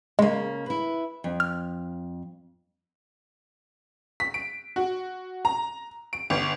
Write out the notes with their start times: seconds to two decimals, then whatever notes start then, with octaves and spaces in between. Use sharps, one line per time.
0.19 C#3 G#3 A#3
0.66 E4 B4
1.24 F2
1.40 F6
4.20 B6
4.34 D7
4.76 F#4
5.45 A#5
6.13 D7
6.30 G1